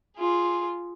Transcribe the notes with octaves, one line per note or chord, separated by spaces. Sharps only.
F4 G#4